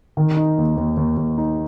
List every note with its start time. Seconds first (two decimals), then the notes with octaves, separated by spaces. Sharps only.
0.17 D#3
0.37 D#4
0.58 D#2
0.77 D#2
0.97 D#2
1.17 D#2
1.38 D#4